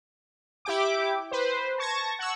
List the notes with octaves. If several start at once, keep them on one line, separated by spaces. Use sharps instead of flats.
E4 G4 G5 D6
B4 C5
A5 C#6 G#6 A#6
F#5 C#6 E6